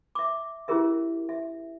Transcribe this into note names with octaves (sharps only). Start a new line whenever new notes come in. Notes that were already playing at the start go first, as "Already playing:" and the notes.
E5 D6
C#4 E4 G4 G#4 A#4 E5
E5